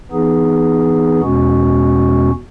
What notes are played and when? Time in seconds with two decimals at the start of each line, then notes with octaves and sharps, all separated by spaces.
0.11 E3 B3 D#4 G#4
1.20 E2 B2 G#3 C#4 F#4